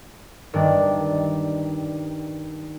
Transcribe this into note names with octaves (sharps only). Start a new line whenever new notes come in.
G2 D#3 D4